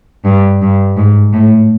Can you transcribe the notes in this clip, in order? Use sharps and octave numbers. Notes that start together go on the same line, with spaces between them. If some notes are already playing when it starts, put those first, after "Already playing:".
G2
G2
G#2
A2